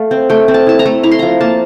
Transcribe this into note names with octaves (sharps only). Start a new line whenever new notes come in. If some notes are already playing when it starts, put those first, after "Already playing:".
Already playing: A3 F5
C4
A3 G5
C4
A5
E4 A5
A#5
A3
E4 A#5
C6
F3 A#5
A#3 A5